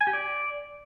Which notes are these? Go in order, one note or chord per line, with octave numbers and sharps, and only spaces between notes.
G#5
G4
D5